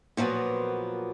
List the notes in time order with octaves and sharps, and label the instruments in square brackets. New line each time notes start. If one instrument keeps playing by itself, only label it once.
[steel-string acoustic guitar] A#2 F3 F#3 A#3 B3